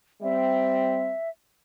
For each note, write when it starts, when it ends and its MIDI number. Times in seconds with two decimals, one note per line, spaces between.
0.22 1.13 55
0.22 1.13 60
0.22 1.29 76